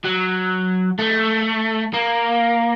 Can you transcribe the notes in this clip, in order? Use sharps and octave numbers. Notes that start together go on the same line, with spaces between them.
F#3
A3
A#3